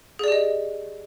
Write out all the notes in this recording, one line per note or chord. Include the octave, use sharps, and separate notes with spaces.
G4 G#4 D5 D#5